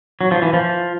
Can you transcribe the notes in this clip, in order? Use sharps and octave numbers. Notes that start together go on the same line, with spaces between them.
F#3
F3
E3
F3